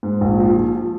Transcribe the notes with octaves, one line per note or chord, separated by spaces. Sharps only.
G#2
A#1
F3
F3
F3